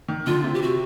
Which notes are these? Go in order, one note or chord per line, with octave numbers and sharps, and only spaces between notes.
D#3
D3 F4
C3
G4
F#4